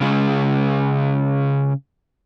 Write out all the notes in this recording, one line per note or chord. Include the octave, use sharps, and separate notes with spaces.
C#3 G#3